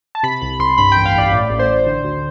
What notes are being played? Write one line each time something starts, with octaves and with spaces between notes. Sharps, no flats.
A5
C3 B5
C2 B5
C2 C6
G2 B5
A1 G5
F5
A1 D5
A2 D5
A1
C5
A1
D3
D2